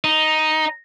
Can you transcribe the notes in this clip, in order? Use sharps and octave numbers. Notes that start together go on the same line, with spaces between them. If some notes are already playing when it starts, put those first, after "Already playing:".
D#4